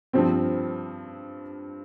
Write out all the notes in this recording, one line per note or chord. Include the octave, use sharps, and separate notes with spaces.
G2 F3 C4